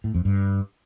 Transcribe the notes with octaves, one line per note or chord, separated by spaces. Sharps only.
A2
F2
G2